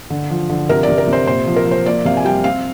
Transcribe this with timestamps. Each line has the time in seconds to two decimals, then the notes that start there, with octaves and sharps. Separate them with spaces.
0.10 D3
0.30 F3
0.50 D3
0.69 C3 A#4
0.83 D5
0.89 C3
0.98 A#4
1.08 C3
1.13 C5
1.27 A#2 C5
1.47 F3
1.56 A#4
1.66 F3
1.71 C5
1.86 A#3 D5
2.05 C3 F5
2.17 G#5
2.25 G3 G5
2.44 C4 F5